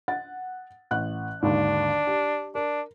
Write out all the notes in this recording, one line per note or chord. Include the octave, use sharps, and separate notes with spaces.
F#5 A6
A1 F#5 F#6
G#1 D#2 D3 D4
G4
D4 A#4